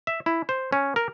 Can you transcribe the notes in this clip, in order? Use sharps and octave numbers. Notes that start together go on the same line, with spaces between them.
E5
E4
C5
C#4
A#4